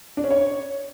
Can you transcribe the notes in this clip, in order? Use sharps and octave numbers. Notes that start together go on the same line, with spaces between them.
D4
C#4
C#5